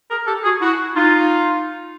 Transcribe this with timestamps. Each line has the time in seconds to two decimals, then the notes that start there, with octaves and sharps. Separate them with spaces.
0.10 G#4 A#4
0.27 G4 A4
0.44 F#4 G#4
0.61 E4 F#4
0.95 D#4 F4